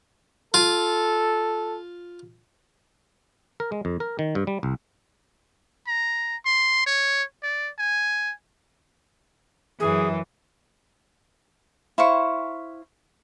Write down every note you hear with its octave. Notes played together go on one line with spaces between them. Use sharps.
F4 A4
A#4
G#3
F2
A#4
D#3
G2
G3
C2
A#5
C6
C#5
D5
G#5
F#2 E3 G#4
E4 C5 F5 C#6